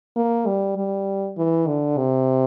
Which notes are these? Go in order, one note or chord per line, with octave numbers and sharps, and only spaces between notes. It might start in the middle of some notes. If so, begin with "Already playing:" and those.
A#3
G3
G3
E3
D3
C3